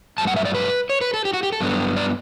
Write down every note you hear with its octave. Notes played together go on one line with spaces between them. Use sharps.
G2 F#3 A3 A5
F#5
E5
D5
B4
C#5
B4
A4
G4
F#4
G4
A4
G2 F#3 B3 D4
D5